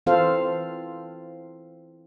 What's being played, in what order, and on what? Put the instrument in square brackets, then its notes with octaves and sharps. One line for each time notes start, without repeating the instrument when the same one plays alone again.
[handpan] E3 C4 F4 A4 C5 F5